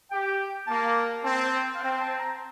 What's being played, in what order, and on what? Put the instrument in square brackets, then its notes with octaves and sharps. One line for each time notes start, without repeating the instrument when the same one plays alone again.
[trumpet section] G4 [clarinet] G5
[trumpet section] A#3 [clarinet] A5
[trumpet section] C4 [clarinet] A5
[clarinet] F5
[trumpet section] C4 [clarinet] G5
[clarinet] A5
A#5